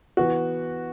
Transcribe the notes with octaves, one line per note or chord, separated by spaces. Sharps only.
E3 B3 F#4